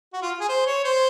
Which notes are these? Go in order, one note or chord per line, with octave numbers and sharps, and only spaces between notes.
F#4
F4
G#4
C5
C#5
C5